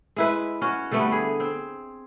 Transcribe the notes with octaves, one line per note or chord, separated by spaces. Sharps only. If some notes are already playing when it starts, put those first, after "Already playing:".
G#3 E4 B4
C#4 F#4
D3 G3 A3 B3
G#4
C4